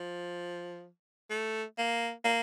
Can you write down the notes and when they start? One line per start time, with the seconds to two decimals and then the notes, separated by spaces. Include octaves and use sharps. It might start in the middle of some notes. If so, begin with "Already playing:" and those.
Already playing: F3
1.30 A3
1.78 A#3
2.25 A#3